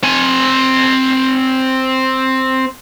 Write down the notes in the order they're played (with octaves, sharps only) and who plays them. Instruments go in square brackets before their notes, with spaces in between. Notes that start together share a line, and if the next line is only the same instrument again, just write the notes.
[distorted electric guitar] C4 G#5